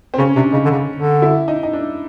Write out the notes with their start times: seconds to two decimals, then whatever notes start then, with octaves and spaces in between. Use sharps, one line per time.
0.14 C4
0.18 C#3 C#4
0.36 C3 D4
0.52 C#3 D#4
0.65 D3
0.70 C#3
0.96 D3
1.22 E4
1.48 D#4
1.63 D#4
1.73 D4